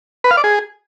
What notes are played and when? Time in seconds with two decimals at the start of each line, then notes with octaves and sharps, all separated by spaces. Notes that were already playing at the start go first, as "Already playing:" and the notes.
0.24 B4
0.31 F5
0.37 D5
0.44 G#4